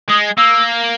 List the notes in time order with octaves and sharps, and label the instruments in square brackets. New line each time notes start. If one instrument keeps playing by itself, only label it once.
[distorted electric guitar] G#3 [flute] D#6
[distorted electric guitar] A#3 [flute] E6